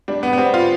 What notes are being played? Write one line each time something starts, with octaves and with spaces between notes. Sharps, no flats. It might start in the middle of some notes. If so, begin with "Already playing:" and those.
G3 D4
B3
B3
G3 C4
F4